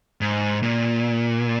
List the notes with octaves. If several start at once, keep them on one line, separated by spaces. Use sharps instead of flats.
G#2
A#2